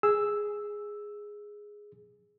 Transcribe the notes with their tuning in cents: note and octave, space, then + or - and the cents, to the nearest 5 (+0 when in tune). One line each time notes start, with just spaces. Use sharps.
G#4 +0 E6 +0